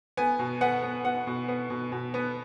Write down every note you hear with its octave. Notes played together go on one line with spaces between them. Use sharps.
B3 G#5
B2
B3 F#5
B3
B3 F#5
B2
B3
B2
B2
B3